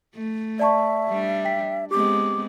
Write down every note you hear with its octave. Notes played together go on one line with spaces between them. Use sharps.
A3
D5 E5 A5 C#6
G3 D4
G5 B6
G#3 B3 C4 G4 D6